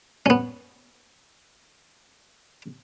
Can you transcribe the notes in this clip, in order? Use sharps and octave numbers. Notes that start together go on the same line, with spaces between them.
B3 C#4